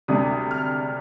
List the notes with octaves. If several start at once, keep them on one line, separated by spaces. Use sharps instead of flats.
D2 C3 G3 D4 D#6
F6